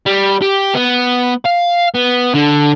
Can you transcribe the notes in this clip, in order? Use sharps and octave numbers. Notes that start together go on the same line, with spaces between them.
G3
G4
B3
F5
B3
D3